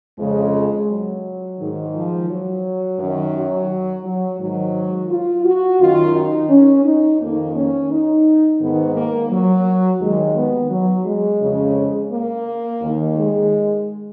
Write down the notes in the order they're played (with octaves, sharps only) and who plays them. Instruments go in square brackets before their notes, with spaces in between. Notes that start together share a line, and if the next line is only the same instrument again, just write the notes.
[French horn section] F2 C#3 G#3
F#3
G#2 D#3
F3
F#3
F#2 D#3
F#3
F#3
G#2 D#3 F#3
F4
F#4
F#2 D#3 F4
D#4
C#4
D#4
F2 D#3 A#3
C#4
D#4
G#2 D#3 B3
A#3
F#3
D#2 D#3 G#3
B3
F#3
G#3
F2 C#3
A#3
D#2 D#3
G#3